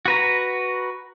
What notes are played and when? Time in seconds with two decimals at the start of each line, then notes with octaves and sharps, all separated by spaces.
0.06 F#4 B4 A#5